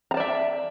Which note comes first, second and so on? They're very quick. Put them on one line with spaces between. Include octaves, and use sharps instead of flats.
A#5 A5 D5 E5